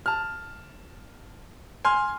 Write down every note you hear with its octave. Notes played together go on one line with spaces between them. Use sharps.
A5 F6
G#5 C6 F6